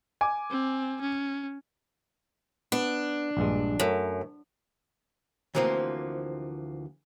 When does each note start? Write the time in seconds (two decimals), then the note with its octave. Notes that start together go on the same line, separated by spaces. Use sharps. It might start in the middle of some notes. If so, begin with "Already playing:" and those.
0.21 G#5 D6
0.50 C4
1.01 C#4
2.72 B3 D4
3.37 A#1 G2 G#3
3.80 F#2 F#3 A3
5.55 D2 E3 F3 A#3 C4